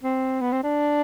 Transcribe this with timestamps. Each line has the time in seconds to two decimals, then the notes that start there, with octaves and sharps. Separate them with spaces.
0.03 C4
0.41 B3
0.52 C4
0.63 D4